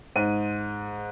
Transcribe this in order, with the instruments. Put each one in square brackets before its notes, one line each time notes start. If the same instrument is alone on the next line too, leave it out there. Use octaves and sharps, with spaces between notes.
[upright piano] G#2 D#7